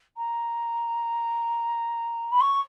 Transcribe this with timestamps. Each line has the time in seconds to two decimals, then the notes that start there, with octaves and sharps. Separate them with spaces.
0.17 A#5
2.32 B5
2.41 C#6